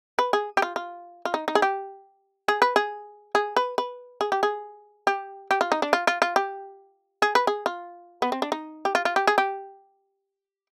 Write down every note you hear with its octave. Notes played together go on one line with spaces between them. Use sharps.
B4
G#4
G4
F4
F4
F4
D#4
D#4
G#4
G4
G#4
B4
G#4
G#4
B4
B4
G#4
G4
G#4
G4
G4
F4
D#4
D4
F4
F4
F4
G4
G#4
B4
G#4
F4
B3
C4
D4
D#4
G4
F4
F4
G4
G#4
G4